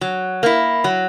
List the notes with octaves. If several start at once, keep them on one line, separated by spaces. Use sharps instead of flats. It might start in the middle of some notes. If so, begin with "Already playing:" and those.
F#3
A#3 E4
F#3